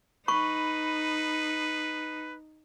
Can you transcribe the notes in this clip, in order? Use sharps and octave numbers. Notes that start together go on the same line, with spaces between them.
D#4 B4 B5 C#6